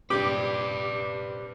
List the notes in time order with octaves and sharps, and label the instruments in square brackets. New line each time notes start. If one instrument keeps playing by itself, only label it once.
[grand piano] A#1 G2 C3 [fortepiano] G4 [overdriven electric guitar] B4 D5 [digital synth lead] D6